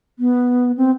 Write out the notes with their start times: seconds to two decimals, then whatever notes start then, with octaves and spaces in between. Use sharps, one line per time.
0.19 B3
0.77 C4